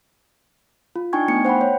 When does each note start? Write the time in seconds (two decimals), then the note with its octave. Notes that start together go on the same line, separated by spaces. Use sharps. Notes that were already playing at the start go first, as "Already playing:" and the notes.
0.96 F4
1.13 D4 D#4 G5 G#5 C#6 G#6
1.28 A3 B3 C#7
1.45 C5 F#5 G5 B5
1.61 C#5